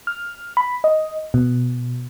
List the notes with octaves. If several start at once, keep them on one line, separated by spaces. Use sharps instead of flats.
F6
B5
D#5
B2